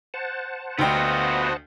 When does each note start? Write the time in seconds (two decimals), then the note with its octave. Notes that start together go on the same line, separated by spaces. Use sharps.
0.14 C5 F#5 A5
0.79 D2 B3 F4 F#4 D#5 G5